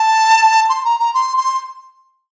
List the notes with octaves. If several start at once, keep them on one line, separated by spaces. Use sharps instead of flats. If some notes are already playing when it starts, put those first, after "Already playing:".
Already playing: A5
C6
A#5
A#5
C6
C6